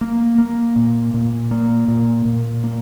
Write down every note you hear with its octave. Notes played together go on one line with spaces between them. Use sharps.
A#3
A#3
A#2
A#2
A#3
A#2
A#2
A#3